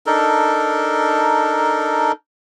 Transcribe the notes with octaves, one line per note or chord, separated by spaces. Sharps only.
D4 D#4 A4 A#4